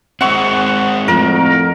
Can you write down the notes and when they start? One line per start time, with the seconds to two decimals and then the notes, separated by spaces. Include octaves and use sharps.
0.21 G#3 C4 F#5 C#6
1.08 F2 A2 A#4